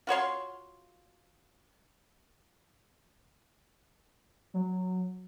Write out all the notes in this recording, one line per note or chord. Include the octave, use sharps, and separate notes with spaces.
F4 F#4 C#5 C6
F#3